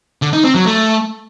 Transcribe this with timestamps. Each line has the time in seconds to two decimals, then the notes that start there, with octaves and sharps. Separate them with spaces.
0.22 D3
0.33 D#4
0.44 C4
0.55 F#3
0.66 A3